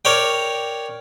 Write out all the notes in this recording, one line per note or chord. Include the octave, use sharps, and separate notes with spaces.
A#4 C#5 D5 G5